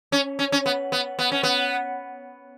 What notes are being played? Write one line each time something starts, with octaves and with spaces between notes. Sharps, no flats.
C#4
C#4
C#4
B3
B3
B3
C#4
B3